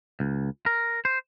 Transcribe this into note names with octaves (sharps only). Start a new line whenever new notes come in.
C#2
A#4
C5